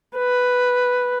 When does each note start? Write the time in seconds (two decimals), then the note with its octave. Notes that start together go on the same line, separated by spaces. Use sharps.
0.18 B4